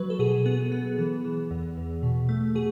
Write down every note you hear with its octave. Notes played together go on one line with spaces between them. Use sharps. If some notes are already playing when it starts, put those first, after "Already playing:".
Already playing: F#3 B4
A4
B2 G#4
B3 G#4
B3
E3
E3
E2
E2
B2
A3
B2 G#4